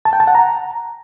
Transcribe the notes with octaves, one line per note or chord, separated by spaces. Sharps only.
A5
G5
A5
F#5
A#5